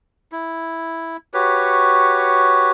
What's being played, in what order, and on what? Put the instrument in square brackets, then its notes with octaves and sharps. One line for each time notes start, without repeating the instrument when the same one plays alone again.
[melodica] E4
F#4 G4 B4 C#5